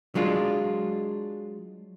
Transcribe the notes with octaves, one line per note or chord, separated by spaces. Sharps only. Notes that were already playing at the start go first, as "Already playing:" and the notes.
F#3 G#3 D4 F4